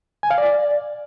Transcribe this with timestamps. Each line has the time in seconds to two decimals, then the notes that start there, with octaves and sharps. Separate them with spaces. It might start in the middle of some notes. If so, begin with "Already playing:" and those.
0.23 G#5
0.31 F5
0.38 D5